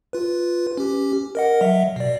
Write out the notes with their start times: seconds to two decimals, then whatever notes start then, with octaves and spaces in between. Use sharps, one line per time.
0.13 F4 B4
0.77 C#4 G4
1.35 A#4 D#5 F#5
1.61 F#3 E5
1.96 B2 D5